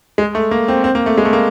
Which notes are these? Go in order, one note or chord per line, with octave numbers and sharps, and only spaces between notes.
G#3
A3
A#3
C4
C4
A#3
A3
G#3
A3
A#3